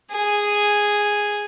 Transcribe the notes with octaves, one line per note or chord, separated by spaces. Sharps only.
G#4